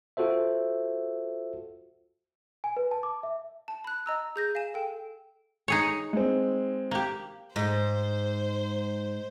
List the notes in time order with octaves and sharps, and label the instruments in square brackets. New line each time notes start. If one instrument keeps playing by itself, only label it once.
[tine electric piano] F4 F#4 A4 C5 E5
[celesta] G#5
B4
A5
D6
E5
[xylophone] A5
B5 F#6
D#5 A#5 E6
G#4 G6 A#6
F5 G#5 E7
A4 G5
[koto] D#4 G#4 C#5
[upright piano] G#3 C4
[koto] A#3 G4
[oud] G#2 [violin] C5